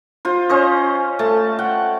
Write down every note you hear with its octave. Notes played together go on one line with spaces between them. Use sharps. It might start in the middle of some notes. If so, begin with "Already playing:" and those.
F4 C5
C#4 C5 D#5
A3 A5
F#5 G5